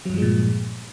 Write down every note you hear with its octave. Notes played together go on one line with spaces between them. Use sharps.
G2 A#2 F3 F#3 G#3